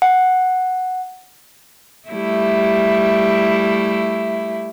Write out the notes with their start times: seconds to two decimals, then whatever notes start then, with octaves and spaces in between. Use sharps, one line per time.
0.02 F#5
2.09 G3 A3 E4